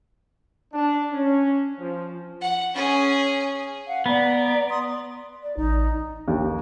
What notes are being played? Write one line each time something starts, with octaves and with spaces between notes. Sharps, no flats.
D4
C#4
F3
F#5
C#4 G#4
F5 F#5
B3 D5 A#5
C6 D#6
D5
A1 D#4
D#2